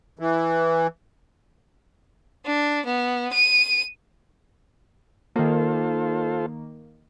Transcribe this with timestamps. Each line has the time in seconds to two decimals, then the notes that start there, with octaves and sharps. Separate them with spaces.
0.19 E3
2.45 D4
2.85 B3
3.33 D#7
5.36 D#3 A#3 F4 A4 C5